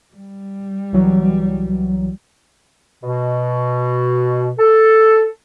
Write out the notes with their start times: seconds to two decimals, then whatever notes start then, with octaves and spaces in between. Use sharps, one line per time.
0.14 G3
0.93 C2 E3 F#3
3.03 B2
4.58 A4